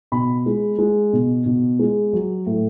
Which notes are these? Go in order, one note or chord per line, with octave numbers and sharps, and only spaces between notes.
B2 B5
G#3
G#3
B2
B2
G#3
F#3
A2